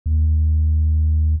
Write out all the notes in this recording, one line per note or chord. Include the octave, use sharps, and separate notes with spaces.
D#2